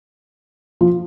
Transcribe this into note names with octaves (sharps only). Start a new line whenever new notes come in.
F3